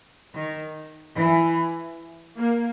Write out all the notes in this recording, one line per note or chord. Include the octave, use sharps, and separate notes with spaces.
D#3
E3
A#3